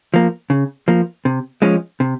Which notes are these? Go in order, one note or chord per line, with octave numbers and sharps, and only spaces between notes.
F3 A#3
C#3
F3 A#3
C3
F3 G#3 C#4
C3